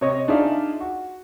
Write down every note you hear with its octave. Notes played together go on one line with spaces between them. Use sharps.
C3 C#5 D#5
D4 D#4 F4 G#4 D5 E5
F#4